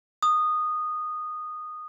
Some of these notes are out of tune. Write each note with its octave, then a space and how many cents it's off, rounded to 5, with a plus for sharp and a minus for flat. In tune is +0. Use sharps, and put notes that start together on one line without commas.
D#6 -15